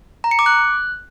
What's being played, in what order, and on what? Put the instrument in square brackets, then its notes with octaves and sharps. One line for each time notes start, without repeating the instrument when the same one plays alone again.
[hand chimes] A#5
C#7
D6
F#6